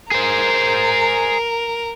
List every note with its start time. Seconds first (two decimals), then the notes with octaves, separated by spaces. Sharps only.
0.12 G#4 A#4 C5